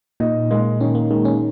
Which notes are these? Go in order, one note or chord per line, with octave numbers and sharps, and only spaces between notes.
A#2 D#4
G#3 A#3
D#3 C#4
A#3
D#3 G#3
C#4